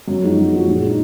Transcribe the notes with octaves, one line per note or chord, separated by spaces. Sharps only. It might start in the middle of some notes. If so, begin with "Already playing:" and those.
F#2
F3 G#3 D#4 F#4
F#2
F3 G#3 D#4 F#4
A#2
G#3 D#4